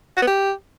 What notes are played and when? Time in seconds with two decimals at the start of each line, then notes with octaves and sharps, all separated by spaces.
0.17 F#4
0.22 B3
0.27 G4